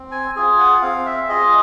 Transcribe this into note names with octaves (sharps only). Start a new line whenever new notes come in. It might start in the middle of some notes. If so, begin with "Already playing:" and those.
Already playing: C4
G#5
F4 G#4 G#5
F#5
C4 F5
E5
F4 G#4 D#5